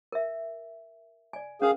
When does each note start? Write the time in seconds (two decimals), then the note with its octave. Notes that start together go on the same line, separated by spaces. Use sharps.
0.12 A#4 E5
1.33 D5 G#5
1.62 C#4 G#4 A#4 F5